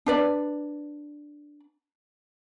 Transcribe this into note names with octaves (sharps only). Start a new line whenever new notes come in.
D4 B4 D5